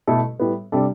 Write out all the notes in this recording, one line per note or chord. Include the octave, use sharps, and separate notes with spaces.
B2 A3 E4 A4
A2 G3 B3
C3 G3 D4 A4